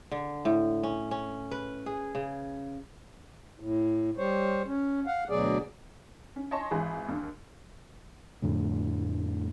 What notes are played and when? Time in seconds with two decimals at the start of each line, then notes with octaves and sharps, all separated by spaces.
0.12 D3
0.45 A2
0.83 C#4
1.11 C#4
1.51 B4
1.86 G#4
2.15 C#3
3.60 A2
4.18 G3 C5 C#5
4.67 C#4
5.07 F5 F#5
5.30 D2 B2 F#3 G#4 D5
6.36 C#4
6.51 C#5 D#5 G#5 A5 C6 C#6
6.71 G#1 E3 G#4 B5
7.09 D#2 D4
8.42 F2 A2 D3 A3